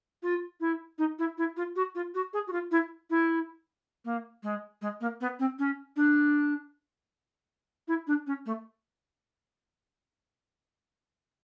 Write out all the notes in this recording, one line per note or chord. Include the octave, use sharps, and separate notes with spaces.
F4
E4
D#4
E4
E4
F4
F#4
F4
F#4
G#4
F#4
F4
E4
E4
A#3
G#3
G#3
A#3
B3
C4
C#4
D4
E4
D4
C#4
A3